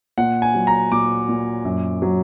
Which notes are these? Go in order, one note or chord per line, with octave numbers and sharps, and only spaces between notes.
A#2 F#5
G#5
F#3
A#5
A#2 D6
A#2
F#2
F#3